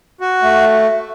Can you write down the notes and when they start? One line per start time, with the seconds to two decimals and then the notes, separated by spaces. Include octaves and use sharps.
0.20 F#4
0.42 A3